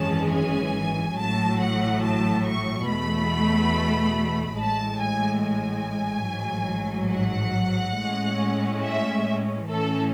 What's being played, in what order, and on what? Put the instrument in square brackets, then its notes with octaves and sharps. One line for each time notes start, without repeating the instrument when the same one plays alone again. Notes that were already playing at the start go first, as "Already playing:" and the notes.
Already playing: [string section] G#1 F#2 E3 G#3 C#4 A5
G#5
A1 A2 F#3 A5
F#5
A5
C#6
E2 B2 A3 B5
A1 A2 G#3 A5
G#5
G#5
A1 G#2 F#3
F#5
A2 G#3 C#4
E5
A2 E3 A3 C#4 A4